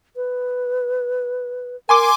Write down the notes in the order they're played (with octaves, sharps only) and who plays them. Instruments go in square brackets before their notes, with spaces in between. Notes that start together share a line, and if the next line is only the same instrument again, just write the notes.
[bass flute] B4
[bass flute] A#4 [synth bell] G#5 C6 D6